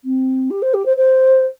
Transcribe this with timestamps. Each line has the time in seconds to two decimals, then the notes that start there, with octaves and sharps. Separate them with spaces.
0.04 C4
0.50 G4
0.62 C5
0.73 G4
0.85 C5
0.97 C5